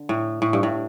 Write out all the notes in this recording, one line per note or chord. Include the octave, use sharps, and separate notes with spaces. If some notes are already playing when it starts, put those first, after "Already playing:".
Already playing: D3
A2
A2
G2
A2